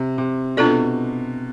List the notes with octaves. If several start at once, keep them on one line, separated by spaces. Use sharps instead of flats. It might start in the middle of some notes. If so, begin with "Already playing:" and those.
Already playing: C3
C3
B2 B3 D4 F4 A4 D5